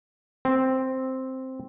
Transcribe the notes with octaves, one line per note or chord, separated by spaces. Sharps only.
C4